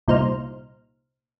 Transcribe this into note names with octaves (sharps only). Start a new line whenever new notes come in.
C2 A#2 D#4 C5 F6